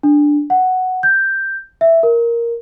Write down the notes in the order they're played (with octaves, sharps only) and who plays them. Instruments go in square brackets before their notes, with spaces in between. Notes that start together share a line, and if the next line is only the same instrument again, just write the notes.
[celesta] D4
F#5
G6
E5
A#4